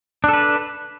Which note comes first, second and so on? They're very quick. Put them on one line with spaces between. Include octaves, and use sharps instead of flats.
D4 A4 B4